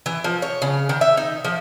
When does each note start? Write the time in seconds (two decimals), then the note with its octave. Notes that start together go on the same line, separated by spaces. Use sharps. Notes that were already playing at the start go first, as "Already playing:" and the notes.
0.06 E3
0.24 F3
0.42 C#5
0.62 C#3
0.89 D#3
1.01 E5
1.17 D#4
1.45 F3